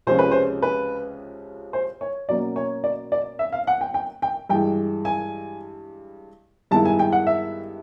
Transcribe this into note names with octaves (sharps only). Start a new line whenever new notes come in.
C#2 C3 F3 G#3 C#4 C5
B4
C5
B4
C5
C#5
B2 F#3 A#3 C#4 D5
C#5
D5
D5
E5
F5
F#5
G5
G5
G5
G2 E3 G#3 G5
G#5
G2 D#3 G#3 B3 E4 A5
G#5
G5
F#5
E5